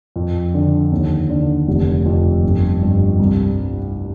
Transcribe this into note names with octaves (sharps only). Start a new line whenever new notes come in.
F2
D3
D#2
D3
F1
F2
G1
G2
C2